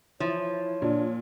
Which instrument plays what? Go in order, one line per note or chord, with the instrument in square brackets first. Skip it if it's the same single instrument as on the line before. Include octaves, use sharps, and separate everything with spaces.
[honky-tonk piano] E3 [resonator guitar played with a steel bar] F3 [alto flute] C#5
[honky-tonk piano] A#2 [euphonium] D4